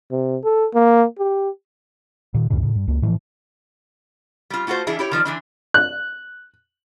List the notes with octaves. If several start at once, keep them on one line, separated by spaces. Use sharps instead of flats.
C3
A4
A#3
G4
A#2 D#3
C#2 F#2 A2 C#3
A2 C#3
G2
C#2 A#3
A2 E3 F3
G3 F4
A3 F4 F#4 A4 C5
E3 D4 E4 G#4
E4 G4 C#5
D#3 F3 D5
D3 E3 D4
F#6